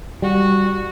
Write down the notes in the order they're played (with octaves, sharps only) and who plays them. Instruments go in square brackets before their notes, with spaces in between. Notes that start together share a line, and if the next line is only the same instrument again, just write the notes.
[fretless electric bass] G3 [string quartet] F#4